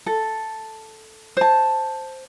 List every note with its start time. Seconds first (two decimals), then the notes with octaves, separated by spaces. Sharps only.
0.06 A4
1.37 C5 A5